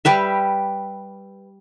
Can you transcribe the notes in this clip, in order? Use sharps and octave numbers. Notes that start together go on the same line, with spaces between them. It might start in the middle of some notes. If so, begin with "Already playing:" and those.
G3 G4 B4 E5